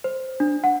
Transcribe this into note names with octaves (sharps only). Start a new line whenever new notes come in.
C5
D4
F#5